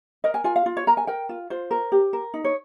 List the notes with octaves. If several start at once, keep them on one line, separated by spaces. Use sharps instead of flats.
A#4 D#5
G#5
F4 G#5
F5
F4
C#5
A#4 A#5
G#5
A#4 G5
F4
F4 C5
A#4
G4
A#4
D#4
C#5